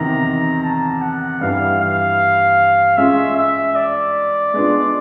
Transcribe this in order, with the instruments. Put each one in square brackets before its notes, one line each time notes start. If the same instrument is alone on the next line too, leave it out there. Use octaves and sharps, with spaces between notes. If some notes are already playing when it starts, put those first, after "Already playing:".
Already playing: [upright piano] E2 C3 D#3 [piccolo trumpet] A#5
[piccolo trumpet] A5
F#5
[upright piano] G2 E3 G3 [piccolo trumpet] F5
[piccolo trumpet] F5
[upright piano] G#3 C#4 F4 [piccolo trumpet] E5
[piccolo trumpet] E5
D5
[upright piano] G#3 B3 D4 F4